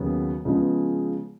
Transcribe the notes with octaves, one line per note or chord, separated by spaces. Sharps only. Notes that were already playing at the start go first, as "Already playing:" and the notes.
Already playing: D#2 C#3 F#3 B3
C#3 F3 G#3 B3